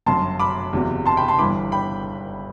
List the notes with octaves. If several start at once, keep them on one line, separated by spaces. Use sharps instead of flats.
G1 F#2 F#3 A5 C6
B5 D6
F#1 E2 C3 F#3
A5 C6
G5 B5
A5 C6
G1 G2 E3 B5 D6
G5 B5